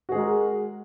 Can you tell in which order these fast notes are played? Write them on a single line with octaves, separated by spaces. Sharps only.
F#4 G#4 G#3 A#4